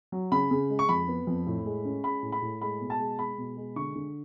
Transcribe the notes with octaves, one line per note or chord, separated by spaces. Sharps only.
F#3
C#3 B5
C#3
G#3
C#6
F2 B5
B3
F2
A2
G#3
C#4
G#3 B5
A2
B5
A2
G#3 B5
B2
A5
G#3
G#3 B5
B2
G#3
D3 C#6
D3